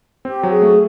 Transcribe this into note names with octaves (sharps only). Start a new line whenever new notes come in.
C4 G4
F#3
G#4
A3